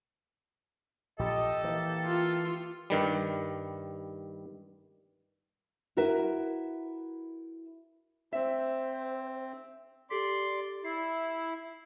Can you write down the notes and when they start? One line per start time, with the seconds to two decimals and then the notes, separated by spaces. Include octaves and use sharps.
1.19 A#1 A#2 G4 A4 D#5
1.64 E3 A#3
2.04 F4
2.90 G2 D#3 G3
5.97 E4 F#4 A#4 B4 E5
8.33 C4 C5 E5
10.10 G4 A4 D5 C6 B6
10.84 E4 C7